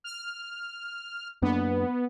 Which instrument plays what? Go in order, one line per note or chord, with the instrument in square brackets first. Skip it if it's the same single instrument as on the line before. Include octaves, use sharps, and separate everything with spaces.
[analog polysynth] F6
[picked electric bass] F#2 A#3 D4 [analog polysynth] B3